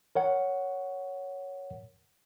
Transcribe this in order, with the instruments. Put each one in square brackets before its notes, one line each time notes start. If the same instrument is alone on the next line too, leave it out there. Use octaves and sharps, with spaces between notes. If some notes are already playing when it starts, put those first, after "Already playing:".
[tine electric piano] A#4 C#5 F#5